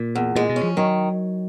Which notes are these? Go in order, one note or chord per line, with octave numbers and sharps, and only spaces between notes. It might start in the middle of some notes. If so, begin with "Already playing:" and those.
Already playing: A#2
E2
A#2 G#3
B2
C#4
F3
D#3 F#3